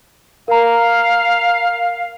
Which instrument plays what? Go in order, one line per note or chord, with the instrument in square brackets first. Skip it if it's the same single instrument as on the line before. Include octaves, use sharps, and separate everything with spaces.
[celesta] A#4 A#5 [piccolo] F5